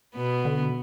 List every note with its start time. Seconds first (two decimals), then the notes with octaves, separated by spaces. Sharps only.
0.16 B2 B3
0.45 D3